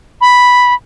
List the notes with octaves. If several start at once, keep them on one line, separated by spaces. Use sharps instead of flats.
B5